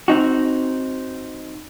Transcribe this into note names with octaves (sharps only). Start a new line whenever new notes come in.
C4 D#4 F#4